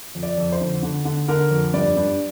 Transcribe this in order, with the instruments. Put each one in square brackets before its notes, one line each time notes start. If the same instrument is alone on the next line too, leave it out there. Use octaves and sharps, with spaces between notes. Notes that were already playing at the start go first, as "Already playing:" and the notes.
[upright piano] F2
D5
F2
C5
D3
D3
D3
D3 A#4
F2
G2 D5
G2